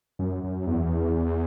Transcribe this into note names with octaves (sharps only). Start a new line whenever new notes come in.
F#2
F#2
E2